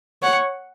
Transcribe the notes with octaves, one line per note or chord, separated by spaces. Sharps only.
C#5 F#5